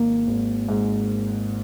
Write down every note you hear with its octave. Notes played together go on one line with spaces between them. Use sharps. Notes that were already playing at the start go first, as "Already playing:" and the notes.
Already playing: G#1 D#3 A#3
G#1
G#2